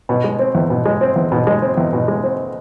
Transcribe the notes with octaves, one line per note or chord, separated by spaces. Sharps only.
B2
G#3
C4
E2
B2
G#3
C4
E2
B2
G#3
C4
E2
B2
G#3
C4